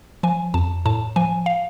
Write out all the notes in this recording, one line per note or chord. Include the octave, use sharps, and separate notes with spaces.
F3 G#5
F2 A5
A2 A5
F3 G#5
F5